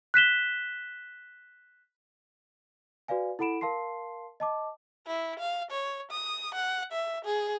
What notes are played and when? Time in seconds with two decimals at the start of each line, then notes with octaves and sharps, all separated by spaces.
0.14 F#6 B6 E7 G7
3.08 F#4 B4 D5 F5 G#5
3.39 E4 A4 F#5 B5 D7 E7
3.61 A#4 F5 A5 C6 C7
4.40 D#5 A5 D6
5.07 E4
5.40 F5
5.71 C#5
6.11 D#6
6.55 F#5
6.92 E5
7.25 G#4